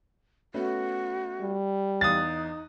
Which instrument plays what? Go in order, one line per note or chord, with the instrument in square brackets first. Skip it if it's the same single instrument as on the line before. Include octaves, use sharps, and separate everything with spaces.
[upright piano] A3 B3 C#4 [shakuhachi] F#4
[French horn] G3
[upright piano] E2 F5 F#6 [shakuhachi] D#4 [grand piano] D#6 A6